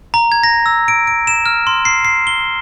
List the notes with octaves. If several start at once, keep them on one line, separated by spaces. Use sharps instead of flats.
A#5
G#6
A#6
E6
D7
D7
E7
F6
C6
C7
C7
G7